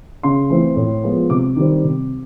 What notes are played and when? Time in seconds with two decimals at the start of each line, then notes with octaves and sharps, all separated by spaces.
0.23 C#3 C6
0.50 E3 A3 C4
0.76 A2
1.04 F3 G#3 B3
1.30 C3 D6
1.56 D#3 G3 C4
1.84 C3